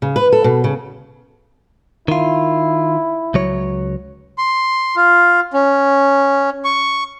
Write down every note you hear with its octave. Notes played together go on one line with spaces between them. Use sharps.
C#3
B4
A4
B2
C#3
D#3 E4 F4
C#2 F#3 C#5
C6
F4
C#4
C#6